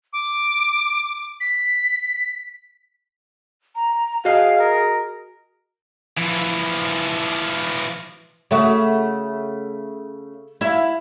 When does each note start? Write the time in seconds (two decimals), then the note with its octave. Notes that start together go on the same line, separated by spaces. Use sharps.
0.13 D6
1.40 B6
3.75 A#5
4.25 F#4 G#4 D#5 F5
4.59 A#4
6.17 E3 F3
8.51 C#3 A3 F#4
10.61 E4 E5 F5